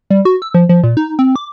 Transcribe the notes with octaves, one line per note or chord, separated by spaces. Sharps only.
G3
F#4
E6
F3
F3
A#2
D#4
C4
D6